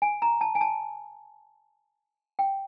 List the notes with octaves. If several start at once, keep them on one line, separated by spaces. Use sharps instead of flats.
G#5
A#5
A5
G#5
A5
G5